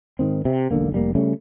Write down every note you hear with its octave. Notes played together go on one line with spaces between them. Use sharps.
G#2 D#3 C4
C3
E1 B1 D3 A#3
F1 G3 A#3
C#3 G3 A3 C#4